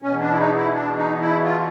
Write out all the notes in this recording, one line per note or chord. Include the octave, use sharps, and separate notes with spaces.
E2 B2 C#4
D4
E4
D#4
E4
D4
D#4
E4
F4